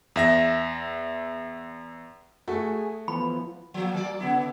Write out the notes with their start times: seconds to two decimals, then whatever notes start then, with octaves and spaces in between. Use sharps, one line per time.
0.16 E2 E5 A#6
2.48 A3 F#4 G#4
3.08 E3 F3 B3 B5
3.74 F3 A#3
3.94 F#3 A#3 D5
4.20 C#3 B3 E4